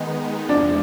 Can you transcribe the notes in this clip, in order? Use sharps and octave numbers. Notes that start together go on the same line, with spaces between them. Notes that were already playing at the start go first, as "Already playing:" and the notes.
Already playing: D#3 G#3 B3 D#4
E2 C3 F3 G#3 D4